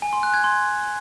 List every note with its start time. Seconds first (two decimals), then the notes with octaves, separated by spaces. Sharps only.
0.02 G#5
0.13 C6
0.23 F#6
0.34 G#6
0.44 C6